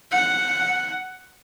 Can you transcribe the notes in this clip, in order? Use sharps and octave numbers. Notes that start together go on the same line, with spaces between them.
F#5